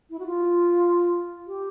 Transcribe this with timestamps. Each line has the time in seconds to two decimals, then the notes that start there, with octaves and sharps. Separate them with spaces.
0.10 E4
0.19 F#4
0.26 F4
1.47 G4